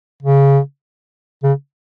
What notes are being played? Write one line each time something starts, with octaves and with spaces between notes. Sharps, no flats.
C#3
C#3